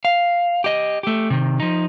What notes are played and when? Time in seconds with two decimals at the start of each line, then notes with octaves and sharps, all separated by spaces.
0.05 F5
0.64 G4 D#5
1.03 A3 G4
1.30 C3 D#3
1.60 F3 D#4